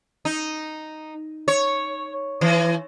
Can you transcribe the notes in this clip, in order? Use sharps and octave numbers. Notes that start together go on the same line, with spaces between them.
D#4
C#5
E3